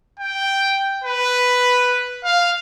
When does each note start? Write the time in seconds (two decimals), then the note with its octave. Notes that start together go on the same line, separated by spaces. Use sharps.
0.20 G5
1.04 B4
2.25 F5